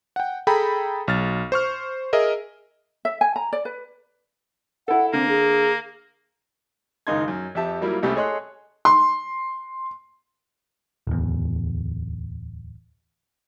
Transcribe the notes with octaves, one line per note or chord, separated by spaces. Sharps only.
F#5 G5
G#4 A4 G5 A#5 B5
B1 F6 A6
C5 C#6 F6
G#4 A#4 D#5 E5
E5
G#5
A#5
D5
B4
E4 A4 F#5
D3 A#3 C4
G#4
F#1 C#2 D#3 D#4 C6 G#6
F#2
F2 G4 E5 A5
F#3 G3 A#3 E4 F4
C2 C3 A3 C#4 G4 B5
G#4 A4 C#5 D#5 C6 F#6
C6
D1 E2